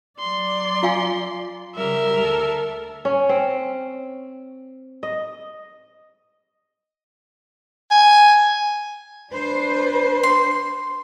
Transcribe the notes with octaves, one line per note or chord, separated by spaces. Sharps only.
F#3 D5 C6
F4 F5 G#5
C#3 G3 A#4 E5
D2 A4
C#4
C4
D#5
G#5
D4 B4 C5
C6